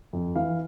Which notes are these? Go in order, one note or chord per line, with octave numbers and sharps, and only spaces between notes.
F2
E3 F5